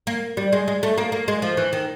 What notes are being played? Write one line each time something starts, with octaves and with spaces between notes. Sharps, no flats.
A#3
G3
G#3
G#3
A3
A#3
A#3
G#3
F3
E3
D#3